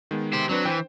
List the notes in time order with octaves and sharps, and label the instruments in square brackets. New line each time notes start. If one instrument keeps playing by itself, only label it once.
[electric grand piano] D#3 G#3 B3
[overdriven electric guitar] G4 C5
[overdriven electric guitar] F#3 [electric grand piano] C4 D4 B4
[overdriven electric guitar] E3 [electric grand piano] C5 G5